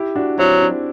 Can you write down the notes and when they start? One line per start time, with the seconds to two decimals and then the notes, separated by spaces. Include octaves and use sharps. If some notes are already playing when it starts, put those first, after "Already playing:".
Already playing: E4 G4
0.16 D4 F#4
0.38 F#3 C4 E4
0.61 D4